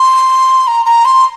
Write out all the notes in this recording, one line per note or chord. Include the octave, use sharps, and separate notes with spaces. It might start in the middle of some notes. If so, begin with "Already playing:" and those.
Already playing: C6
A#5
A#5
C6